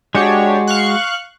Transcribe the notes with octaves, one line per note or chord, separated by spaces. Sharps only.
G#3 D4 F#4 G4 C#5
F5 C#6 F#6